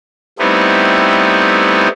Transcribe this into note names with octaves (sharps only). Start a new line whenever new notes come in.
G3 A3 B3 C4 D#4 E4